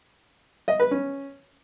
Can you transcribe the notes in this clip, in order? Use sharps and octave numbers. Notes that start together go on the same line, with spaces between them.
D#5
B4
C#4